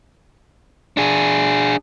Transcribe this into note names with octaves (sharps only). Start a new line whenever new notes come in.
D4 G#4